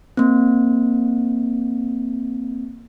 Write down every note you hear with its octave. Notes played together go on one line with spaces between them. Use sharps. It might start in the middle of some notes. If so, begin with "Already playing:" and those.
A#3 C4